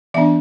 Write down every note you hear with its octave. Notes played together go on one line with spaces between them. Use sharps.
E3 B3 D4 E5